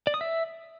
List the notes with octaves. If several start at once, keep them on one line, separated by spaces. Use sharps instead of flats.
D5
D#6
E5